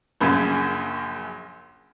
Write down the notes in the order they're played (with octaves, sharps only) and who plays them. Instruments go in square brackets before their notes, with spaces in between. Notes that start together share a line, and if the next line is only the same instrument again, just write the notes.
[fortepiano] A#1 F#2 C#3 G#5